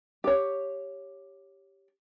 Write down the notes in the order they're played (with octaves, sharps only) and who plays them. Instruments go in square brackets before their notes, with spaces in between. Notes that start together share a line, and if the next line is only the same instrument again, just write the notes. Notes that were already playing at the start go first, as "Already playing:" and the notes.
[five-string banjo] G4 C#5